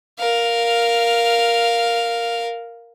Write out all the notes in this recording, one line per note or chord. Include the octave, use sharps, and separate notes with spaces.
A#4 F5